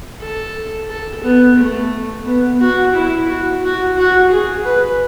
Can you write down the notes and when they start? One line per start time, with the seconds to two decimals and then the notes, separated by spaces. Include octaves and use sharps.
0.21 A4
0.89 A4
1.23 B3
1.57 A3
2.26 B3
2.60 F#4
2.94 E4
3.28 F#4
3.62 F#4
3.97 F#4
4.30 G#4
4.65 B4